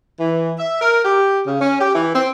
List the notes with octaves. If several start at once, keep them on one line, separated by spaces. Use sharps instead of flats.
E3
E5
A#4
G4
C#3
C#4
G4
E3
C4